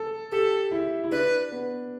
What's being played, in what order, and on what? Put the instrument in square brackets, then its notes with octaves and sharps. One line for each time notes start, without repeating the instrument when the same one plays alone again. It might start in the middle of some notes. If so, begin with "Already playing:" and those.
Already playing: [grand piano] A4
[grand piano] G4 [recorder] A4
[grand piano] E4
E4
[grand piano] D4 [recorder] B4
[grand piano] B3